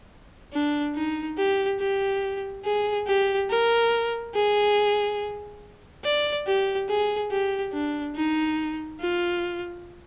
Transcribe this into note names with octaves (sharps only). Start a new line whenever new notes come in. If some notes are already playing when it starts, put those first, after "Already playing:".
D4
D#4
G4
G4
G#4
G4
A#4
G#4
D5
G4
G#4
G4
D4
D#4
F4